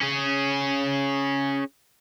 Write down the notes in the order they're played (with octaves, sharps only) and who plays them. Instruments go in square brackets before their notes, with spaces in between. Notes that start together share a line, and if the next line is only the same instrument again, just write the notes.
[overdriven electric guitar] C#4 G#4